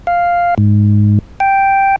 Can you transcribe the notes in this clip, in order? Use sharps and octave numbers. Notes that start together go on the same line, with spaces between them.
F5
G#2
G5